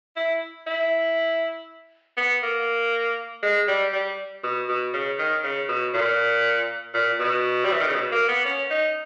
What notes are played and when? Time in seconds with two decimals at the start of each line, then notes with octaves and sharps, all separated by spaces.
0.16 E4
0.67 E4
2.17 B3
2.43 A#3
3.43 G#3
3.68 G3
3.93 G3
4.44 B2
4.69 B2
4.94 C#3
5.19 D#3
5.44 C#3
5.69 B2
5.94 A#2
6.95 A#2
7.20 B2
7.65 G3
7.72 E3
7.80 D#3
7.87 C#3
7.95 B2
8.12 A#3
8.29 B3
8.45 C#4
8.70 D#4